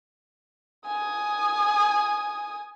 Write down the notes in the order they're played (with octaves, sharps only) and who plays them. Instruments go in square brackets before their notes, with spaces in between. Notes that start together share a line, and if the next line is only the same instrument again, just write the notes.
[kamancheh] G#5 D#6